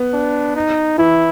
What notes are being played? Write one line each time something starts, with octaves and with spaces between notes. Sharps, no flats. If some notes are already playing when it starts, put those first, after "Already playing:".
Already playing: B3
D4
D#4
E3 E4